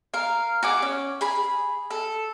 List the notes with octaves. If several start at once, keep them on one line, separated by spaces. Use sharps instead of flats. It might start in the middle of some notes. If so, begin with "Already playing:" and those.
A#4 F5
F#4 G#4 D6
C#4
G#4 B5
A4